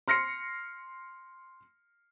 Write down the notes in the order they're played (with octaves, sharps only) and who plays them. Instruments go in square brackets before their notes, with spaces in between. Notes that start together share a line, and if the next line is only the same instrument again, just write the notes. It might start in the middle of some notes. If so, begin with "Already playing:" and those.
[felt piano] C6 F6 A#6 C7 C#7